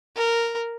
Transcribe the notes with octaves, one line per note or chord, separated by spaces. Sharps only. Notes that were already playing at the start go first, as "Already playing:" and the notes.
A#4